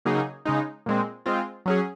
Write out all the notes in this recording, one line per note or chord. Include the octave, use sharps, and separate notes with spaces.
C#3 F#3 A#3 D#4 G#4
C#3 G#3 D#4
A#2 G#3 C4
G#3 C4 F4
F#3 C#4 G#4